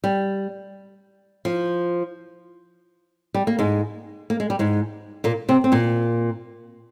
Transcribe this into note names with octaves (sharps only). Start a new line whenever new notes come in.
G3
F3
G3
A#3
G#2 G#3
A#3
G#3
G3
G#2 G#3
A#2 A#3
C3 C4
C4
A#2 A#3